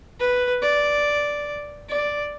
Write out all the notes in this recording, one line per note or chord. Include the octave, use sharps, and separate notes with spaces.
B4
D5
D5